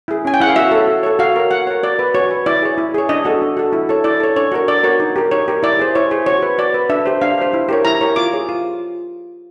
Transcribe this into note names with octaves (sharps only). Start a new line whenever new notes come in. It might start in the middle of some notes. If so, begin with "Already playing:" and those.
E4 G#4
C#4 G#5
G5
E4 G#4 F#5
F5
F#4 E5
A4 C#5
F#4
A4 C#5
F#4 F5
A#4 C#5
F#4 F#5
A#4 C#5
F#4 D5
B4
F#4 C#5
B4
E4 D5
G#4 C#5
E4
G#4 C#5
D4 D#5
F#4 A4
D4
F#4 A4
E4
A4 C#5
E4 D5
A4 C#5
D4 C#5
F#4 A#4 C#5
D4 D5
F#4 A#4 C#5
D#4
G4 A#4
D#4 C#5
G4 A#4
E4 D5
G#4 C5
E4 C#5
G#4 C5
F#4 C#5
B4
F#4 D5
B4
D4 E5
G4 C5
D4 F5
G4 C5
E4
G4 A#4 C#5
E4 A#5
G4 A#4 C#5
F4 D6
G#4 C#5
F4